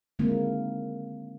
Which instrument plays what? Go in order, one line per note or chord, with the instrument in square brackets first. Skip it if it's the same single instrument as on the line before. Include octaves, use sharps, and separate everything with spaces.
[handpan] D3 D#3 G#3 A#3 C4 E4